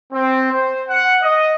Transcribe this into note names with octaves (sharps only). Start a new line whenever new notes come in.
C4
C5
F#5
D#5